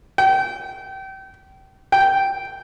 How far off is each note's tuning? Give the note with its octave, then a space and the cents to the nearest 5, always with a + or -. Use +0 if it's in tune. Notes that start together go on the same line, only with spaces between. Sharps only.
G5 -30
G5 -10